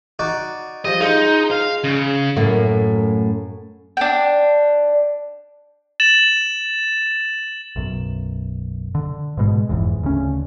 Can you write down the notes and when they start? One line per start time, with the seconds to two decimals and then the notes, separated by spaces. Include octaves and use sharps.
0.19 D#4 F#4 D5
0.85 F3 G3 D#5
1.01 G#3 D#4 F4
1.51 F5
1.84 C#3
2.36 F#2 A2 A#3
3.97 D4 G5
6.00 A6 E7 F#7
7.76 B1 F#2
8.95 D3
9.37 G#2 B2 G#3
9.69 F1 E2 G#2
10.03 D2 C#3 C#4